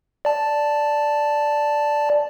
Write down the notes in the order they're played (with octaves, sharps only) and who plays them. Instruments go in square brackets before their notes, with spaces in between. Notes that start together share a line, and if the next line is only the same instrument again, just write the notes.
[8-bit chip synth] D5 A5